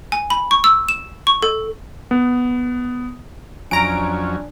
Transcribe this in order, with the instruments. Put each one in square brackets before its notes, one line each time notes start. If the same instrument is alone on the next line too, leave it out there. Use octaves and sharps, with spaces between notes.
[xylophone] G#5
B5
C#6
E6
E7
C#6
A4
[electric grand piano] B3
[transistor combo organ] F2 F#3 C#4 [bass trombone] D4 [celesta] G#5 [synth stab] A#5 D7